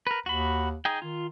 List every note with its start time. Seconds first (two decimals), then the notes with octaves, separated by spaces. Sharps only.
0.07 A#4 B4
0.26 D#2 F#4 B5
0.85 D#4 G#4 G5
1.02 D#3 F4